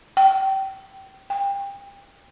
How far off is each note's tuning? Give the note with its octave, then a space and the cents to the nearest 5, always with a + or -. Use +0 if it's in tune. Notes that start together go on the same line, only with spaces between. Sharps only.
G5 -25
G5 +30